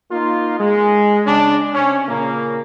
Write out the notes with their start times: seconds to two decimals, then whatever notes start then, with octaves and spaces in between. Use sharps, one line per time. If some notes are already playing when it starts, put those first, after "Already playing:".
0.11 A#3 D#4 F4
0.60 G#3
1.26 C#3 G#3 D4
1.74 C3 C#4
2.08 A#2 C#3 A#3